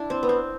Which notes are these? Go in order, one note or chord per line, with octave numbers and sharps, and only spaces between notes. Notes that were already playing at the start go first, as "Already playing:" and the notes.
Already playing: D4 E4
C4
B3
C4